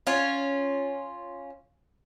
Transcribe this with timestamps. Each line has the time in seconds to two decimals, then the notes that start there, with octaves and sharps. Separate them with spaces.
0.07 C#4 F4